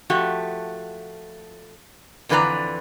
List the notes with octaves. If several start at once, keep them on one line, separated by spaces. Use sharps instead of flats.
F3 A3 F#4 G4
F2 D3 E3 B4 D5 A#5